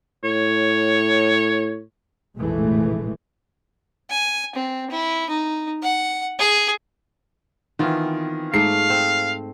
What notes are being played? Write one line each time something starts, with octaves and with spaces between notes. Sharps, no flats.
A2 C#5
F1 A#1 A2 E3 G#3 A3
G#5
C4
E4
D#4
F#5
G#4
D#3 E3 B3 C4 F4
G#2 A3 F5 C7
C4